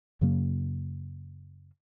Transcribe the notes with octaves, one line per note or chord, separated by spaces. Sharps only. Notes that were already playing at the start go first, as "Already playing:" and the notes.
F#2 C#3 F#3 A#3